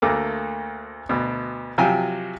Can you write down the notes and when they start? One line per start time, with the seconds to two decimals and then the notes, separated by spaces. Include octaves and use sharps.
0.02 D2 A3 A#3 D6
1.09 D2 B2
1.78 C3 F3 F#3 G5 G#5